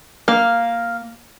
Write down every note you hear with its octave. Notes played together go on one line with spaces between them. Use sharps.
A#3 F5